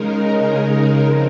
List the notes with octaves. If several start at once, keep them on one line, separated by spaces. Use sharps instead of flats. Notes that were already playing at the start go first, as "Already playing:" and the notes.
Already playing: C#3 G#3 D#4 A#4
F3 C4